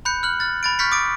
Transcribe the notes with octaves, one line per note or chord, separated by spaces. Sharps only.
B5 F#6 G6 C#7
F6 F#6 F#7
F6 A6
B5 A6 D7
C#6 F6 G6 A6 B6 C#7
D6 D#6 A6 D7